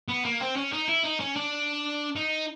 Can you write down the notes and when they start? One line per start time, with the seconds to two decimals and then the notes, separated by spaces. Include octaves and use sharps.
0.08 B3
0.24 A#3
0.40 C4
0.56 C#4
0.72 D#4
0.88 E4
1.04 D#4
1.20 C#4
1.36 D4
2.16 D#4